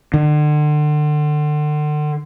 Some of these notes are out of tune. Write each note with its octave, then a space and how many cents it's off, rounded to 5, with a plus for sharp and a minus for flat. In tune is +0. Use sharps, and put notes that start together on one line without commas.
D3 +40